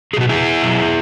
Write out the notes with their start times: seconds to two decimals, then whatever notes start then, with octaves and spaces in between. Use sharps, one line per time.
0.13 F#3 G#4
0.16 B2 F#4
0.29 E4 G#4
0.62 B2 F#3